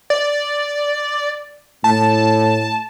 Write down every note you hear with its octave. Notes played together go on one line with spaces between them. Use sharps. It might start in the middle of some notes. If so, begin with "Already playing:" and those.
D5
A2 A5